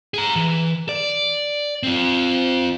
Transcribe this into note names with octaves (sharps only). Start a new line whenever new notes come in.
G#4 A#5
E3
D5
C4 F4